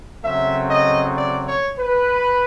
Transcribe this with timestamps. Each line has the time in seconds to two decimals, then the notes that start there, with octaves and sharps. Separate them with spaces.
0.24 C#3 F#3 A3 C4 E5
0.70 D#5
1.17 D5
1.48 C#5
1.79 B4